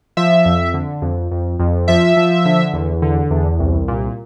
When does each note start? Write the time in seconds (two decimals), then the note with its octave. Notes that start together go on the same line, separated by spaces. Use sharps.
0.17 F3 E5
0.45 F2
0.74 D3
1.02 F2
1.31 F2
1.59 F2
1.88 F3 E5
2.17 F3
2.45 D3
2.73 E2
3.02 D3
3.31 E2
3.59 C2
3.88 A#2